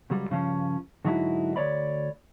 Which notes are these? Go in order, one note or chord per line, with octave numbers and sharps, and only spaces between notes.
C#2 F#3 G3
G2 C#3 F3 C#4
G#2 D3 F#3 D#4 E4 F#4
D2 D#3 C#5 D5 B5